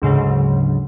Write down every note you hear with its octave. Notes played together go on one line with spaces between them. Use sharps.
D2 G#2 C#3 F#3